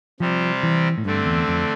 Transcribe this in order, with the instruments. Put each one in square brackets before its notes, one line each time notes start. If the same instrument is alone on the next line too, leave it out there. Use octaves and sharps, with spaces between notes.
[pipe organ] C3 G3 C4 [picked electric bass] F3
[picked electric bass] E3
A2
[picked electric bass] G2 [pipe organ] D3 A3 C4
[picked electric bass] E2
F2